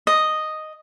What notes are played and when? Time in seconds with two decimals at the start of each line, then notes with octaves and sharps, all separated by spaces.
0.07 D#5